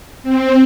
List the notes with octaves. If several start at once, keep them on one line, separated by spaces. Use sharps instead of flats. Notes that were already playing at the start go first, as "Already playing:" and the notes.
C4